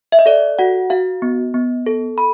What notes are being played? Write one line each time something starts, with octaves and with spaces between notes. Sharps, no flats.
E5
D#5
A4 D5
F#4 F#5
F#4 F5
B3
B3
A4
B5